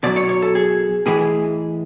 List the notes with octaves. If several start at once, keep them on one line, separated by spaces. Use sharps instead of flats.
B2 F#3 D5
C#5
C#5
A4
G#4
A2 E3 G#3 G#4